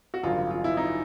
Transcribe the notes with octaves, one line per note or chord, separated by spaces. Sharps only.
F#4
A1 G2 D3 F#3 F4
F4
E4
D#4